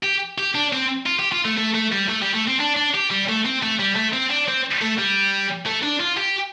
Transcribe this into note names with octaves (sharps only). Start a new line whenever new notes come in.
G4
G4
D4
C4
F4
G4
F4
A3
A3
A3
G3
A3
G3
A3
C4
D4
D4
G4
G3
A3
C4
A3
G3
A3
C4
D4
C4
A3
G3
A3
D4
F4
G4